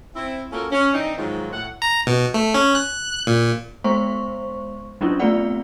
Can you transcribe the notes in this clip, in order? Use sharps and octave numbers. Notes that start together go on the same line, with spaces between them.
C4 E4
A#3 C#4 F4 F#4 A4 A#4
C#4
E3 C4 D4 D#4
G#2 D#3 F3 F#3
A2 F#5
A#5
B2
A3
C#4
F#6
A#2
G#3 B3 C5 C6 C#6
F#3 C#4 D4 E4 F4
A3 B3 C4 F4 D5 F#5